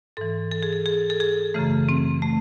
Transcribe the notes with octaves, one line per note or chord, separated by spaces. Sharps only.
G#2 E3 A4
A4
G#4
A4
G#4
A4
G#4
F#2 C#3 E3 A3
C4
A3